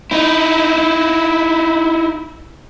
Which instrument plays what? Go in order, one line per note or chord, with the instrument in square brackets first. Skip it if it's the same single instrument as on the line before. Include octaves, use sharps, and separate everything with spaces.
[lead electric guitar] D#4 E4